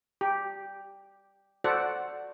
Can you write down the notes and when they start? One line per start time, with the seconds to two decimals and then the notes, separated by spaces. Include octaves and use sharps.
0.21 G4
1.64 F#4 A4 C5 D5 F#5